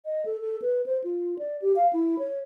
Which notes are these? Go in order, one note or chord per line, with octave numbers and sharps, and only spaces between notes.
D#5
A4
A4
B4
C5
F4
D5
G4
F5
E4
C#5